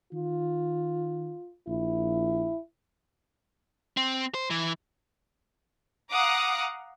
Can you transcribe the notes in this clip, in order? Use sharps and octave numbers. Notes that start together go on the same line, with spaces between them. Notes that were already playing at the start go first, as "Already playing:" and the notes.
D#3 F4
A#1 E4
C4
C5
E3
F5 F#5 A#5 D6 D#6